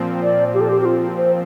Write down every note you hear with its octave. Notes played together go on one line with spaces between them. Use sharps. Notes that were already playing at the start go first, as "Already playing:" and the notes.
Already playing: A#2 F3 C4
D5
G4
A4
G4
G4
F4
C5